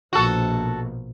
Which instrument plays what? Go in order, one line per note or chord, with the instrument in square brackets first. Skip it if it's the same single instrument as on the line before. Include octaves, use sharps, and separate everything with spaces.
[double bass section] A#1 B2 [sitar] F#4 A4